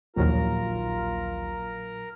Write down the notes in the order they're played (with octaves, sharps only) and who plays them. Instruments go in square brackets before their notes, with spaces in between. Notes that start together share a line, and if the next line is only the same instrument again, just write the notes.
[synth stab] A#1 D#2 [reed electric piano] A#2 F#3 [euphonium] F4 [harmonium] A#4 A#5